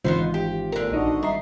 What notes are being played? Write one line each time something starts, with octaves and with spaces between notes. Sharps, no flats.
G#1 E3 B3 D#4 F4 C5
G4
A#2 D3 A#4 A#5
A#1 D4 D#4 F#4 D#5
G3 A3 A#5 C7